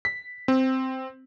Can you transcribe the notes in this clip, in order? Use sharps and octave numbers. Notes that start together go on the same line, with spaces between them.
B6
C4